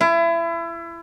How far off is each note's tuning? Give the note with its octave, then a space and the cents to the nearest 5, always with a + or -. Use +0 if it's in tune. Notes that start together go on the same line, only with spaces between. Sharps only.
E4 +30